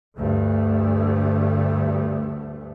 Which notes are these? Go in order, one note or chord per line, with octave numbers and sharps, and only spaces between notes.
D2 G2 A3